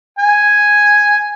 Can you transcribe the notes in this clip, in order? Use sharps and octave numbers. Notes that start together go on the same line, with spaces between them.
G#5